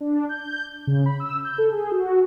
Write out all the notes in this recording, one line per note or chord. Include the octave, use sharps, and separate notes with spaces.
D4
G6
C#3
B5
E6
G6
A4
G#4
F#4